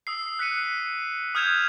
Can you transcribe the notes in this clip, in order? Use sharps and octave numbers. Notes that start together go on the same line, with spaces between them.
D#6 E6 C7
F#6 B6 C#7 D#7
D#6 F6 G6 G#6 E7 F7